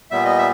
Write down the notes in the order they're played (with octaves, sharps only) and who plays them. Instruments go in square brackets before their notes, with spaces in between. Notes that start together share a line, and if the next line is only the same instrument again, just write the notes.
[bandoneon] A#2 G3 B3 E5
D#5
E5